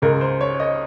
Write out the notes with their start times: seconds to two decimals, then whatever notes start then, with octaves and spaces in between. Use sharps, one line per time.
0.02 C#2 C#3 G#3 A#4
0.21 C5
0.41 C#5
0.60 D#5